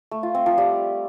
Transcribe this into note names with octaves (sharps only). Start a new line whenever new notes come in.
A3
F4
C4
F3
G3